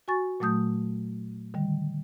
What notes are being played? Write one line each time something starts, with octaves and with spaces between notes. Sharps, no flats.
F#4 G#5 C#6 A6
A#2 F#3 A3 D#6 G6
D3 D#3 G3